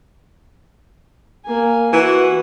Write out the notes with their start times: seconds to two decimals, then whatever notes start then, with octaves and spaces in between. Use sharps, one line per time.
1.46 A#3 G#5
1.93 E3 F#4